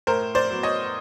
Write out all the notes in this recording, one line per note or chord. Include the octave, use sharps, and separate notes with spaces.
A2 A#4 C5
C5 D5
F#3 B3
C#5 D#5